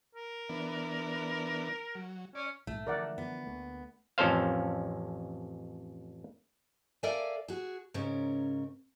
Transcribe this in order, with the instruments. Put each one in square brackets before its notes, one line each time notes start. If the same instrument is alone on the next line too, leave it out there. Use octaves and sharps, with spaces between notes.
[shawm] A#4
[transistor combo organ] E3 B3 D4
F#3
[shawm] C#4 [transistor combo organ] D5
[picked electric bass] A#1 G#2 [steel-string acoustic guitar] A3
[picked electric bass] D3 E3 F3 [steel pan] A#4 D5 F#5
[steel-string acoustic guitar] B3
[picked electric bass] D2 A3 A#3
[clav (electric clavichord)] A1 F2 C#4 A4 C5 F5
[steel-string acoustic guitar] A4 A#4 D5 E5 F5 G#5
F#4 G#4
G#2 C#3 C#4 A#4